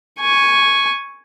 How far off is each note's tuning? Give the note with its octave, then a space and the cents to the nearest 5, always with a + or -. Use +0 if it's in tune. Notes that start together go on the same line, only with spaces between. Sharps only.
G#5 +0 C#6 +0